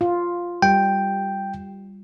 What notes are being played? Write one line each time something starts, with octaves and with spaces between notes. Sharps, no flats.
F4
G3 G5